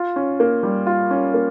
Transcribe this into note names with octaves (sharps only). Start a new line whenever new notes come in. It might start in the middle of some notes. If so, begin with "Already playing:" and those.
Already playing: F4
C#4
A#3
G3
F4
C#4
A#3